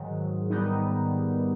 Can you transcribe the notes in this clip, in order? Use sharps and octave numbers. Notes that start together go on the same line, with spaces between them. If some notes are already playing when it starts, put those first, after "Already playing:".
Already playing: G#2 D#3 F#3
G#2 D#3 G3 B3 D#4